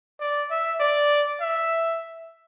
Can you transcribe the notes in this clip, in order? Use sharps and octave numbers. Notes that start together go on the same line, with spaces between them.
D5
E5
D5
E5